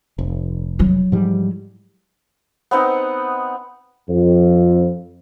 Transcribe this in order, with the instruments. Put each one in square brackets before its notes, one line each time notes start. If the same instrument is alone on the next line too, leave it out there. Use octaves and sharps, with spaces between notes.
[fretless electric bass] F1
[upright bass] F#3 E4
[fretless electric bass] G#2 F3 G3
[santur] B3 C4 D#4 F#5
[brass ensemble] F2